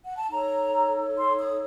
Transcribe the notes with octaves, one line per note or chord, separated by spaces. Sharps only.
F#5
A5
D#4 A4 C#5 A#5
C6
D#6